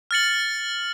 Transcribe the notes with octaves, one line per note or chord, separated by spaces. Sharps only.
F6 A6 C#7 F#7